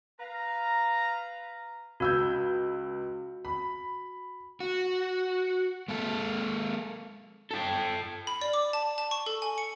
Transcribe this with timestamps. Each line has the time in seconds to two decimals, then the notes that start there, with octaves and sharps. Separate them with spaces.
0.18 B4 F5 A#5
2.00 C#2 F#4 E6 G6
3.45 B5
4.60 F#4
5.88 G#3 A#3 A4
7.51 A4 G5
8.27 B5
8.41 D5
8.53 D6
8.73 A5
8.98 A5
9.11 C#6
9.26 A4
9.42 G#5
9.58 C#7